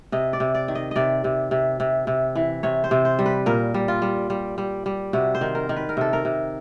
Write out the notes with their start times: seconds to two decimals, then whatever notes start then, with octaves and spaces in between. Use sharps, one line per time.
0.12 C3 D#5
0.33 D5
0.40 C3
0.55 D5
0.68 D#3
0.75 D#5
0.91 C3 D5 D#5
1.24 C3
1.51 C3
1.80 C3
2.07 C3
2.35 E3
2.63 C3 C#5
2.84 C5
2.91 C3
3.05 C5
3.19 G3
3.26 B4
3.46 A#2 A#4
3.74 G3
3.88 F4
4.02 G3
4.30 G3
4.58 G3
4.86 G3
5.13 C3 F#4
5.35 C5
5.41 D#3
5.55 A#4
5.69 D#3
5.76 B4
5.89 A#4
5.97 C3 A4
6.13 A#4
6.25 C3